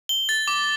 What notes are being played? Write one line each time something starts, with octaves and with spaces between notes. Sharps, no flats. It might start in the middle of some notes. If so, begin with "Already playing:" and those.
G7
A6
D6